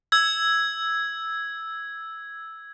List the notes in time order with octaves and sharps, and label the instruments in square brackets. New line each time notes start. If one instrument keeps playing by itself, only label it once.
[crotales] E6 G#6